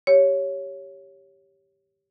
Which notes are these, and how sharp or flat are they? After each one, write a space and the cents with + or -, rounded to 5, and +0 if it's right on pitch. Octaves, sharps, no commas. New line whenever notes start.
G4 +0 C#5 +0